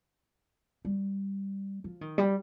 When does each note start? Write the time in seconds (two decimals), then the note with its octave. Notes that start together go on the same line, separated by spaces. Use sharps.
0.85 G3
1.84 F3
2.01 D#3
2.18 G3